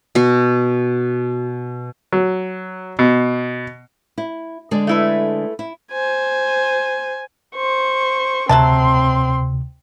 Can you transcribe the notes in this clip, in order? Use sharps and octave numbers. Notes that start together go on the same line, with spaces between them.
B2 F#4
F#3
B2
E4
D3 G#3 D5
A3 E4 B4
E4
C5 G#5
C5 C#6
D2 C3 F#3 C4 E5 A5 C6